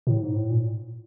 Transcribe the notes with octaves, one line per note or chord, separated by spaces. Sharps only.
A2
G#2
A2
A#2